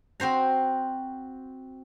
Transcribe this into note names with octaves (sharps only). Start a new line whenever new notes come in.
C4 F#4 C5 A#5